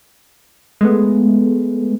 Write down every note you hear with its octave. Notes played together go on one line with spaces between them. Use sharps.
G#3 A3 B3